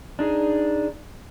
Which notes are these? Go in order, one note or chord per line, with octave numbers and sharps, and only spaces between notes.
D4 D#4 G#4